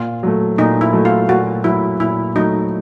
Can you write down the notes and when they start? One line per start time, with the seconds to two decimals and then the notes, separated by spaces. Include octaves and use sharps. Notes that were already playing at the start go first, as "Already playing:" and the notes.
Already playing: A#2 F4
0.23 F#3 A3
0.58 A#2 D#4
0.81 E4
0.93 F#3 A3
1.05 F4
1.29 A#2 F#4
1.64 F#3 A3 E4
2.00 A#2 E4
2.36 F#3 A3 D#4